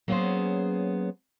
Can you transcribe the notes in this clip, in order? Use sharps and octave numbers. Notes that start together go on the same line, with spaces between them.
F#3 A#3 B3 C#4 G#4 C5